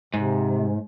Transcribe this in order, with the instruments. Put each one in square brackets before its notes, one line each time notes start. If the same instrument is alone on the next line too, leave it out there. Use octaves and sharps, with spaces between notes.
[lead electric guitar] G#2 [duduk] C3